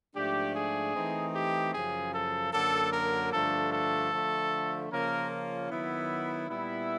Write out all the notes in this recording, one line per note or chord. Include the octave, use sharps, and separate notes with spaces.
G#2 F3 A3 D4 G4
G#4
E3 A3 C4 D#4
G4
F#2 C#3 F3 G#4
A4
F#2 D3 F#3 A#3 A4
A#4
G2 D3 F3 A3 D4 A4
A4
D3 F3 A3
C#3 F3 A#3 C#4 F4 A#4
D#3 F#3 B3 E4
A#2 G3 B3 E4